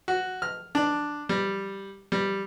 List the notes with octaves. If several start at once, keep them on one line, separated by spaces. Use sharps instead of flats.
F#4
F6
D4
G3
G3